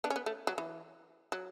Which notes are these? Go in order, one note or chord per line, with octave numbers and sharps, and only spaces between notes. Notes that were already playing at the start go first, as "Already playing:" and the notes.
B3 D4
C#4
B3
A3
F#3
E3
F#3